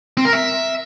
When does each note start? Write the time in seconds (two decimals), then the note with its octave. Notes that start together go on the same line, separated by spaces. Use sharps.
0.17 C4
0.25 A#4
0.33 E5